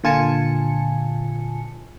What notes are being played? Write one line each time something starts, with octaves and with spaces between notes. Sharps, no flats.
A#2 D3 F4 G#5 A5 C#7